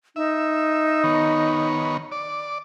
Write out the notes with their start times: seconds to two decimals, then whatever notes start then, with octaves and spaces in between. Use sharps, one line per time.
0.16 D#4 E5
1.04 D#3 B3 C#5
2.12 D5